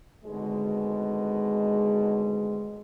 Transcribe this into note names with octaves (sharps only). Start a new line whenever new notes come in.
G#1 D2 B2 D3 G#3